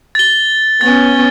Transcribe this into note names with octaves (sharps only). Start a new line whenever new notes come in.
A6 G7
B3 C#4 A6